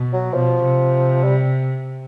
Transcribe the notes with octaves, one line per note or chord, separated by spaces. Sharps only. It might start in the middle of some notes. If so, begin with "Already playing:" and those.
Already playing: B2
F#3
B2 F3
C3
G3